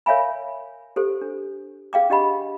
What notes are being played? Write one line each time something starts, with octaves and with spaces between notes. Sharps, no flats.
A#4 C#5 E5 F5 G#5 B5
G4 A4 C5
D4
G#4 F5 G5 D6
D4 G4 D#5 F#5 B5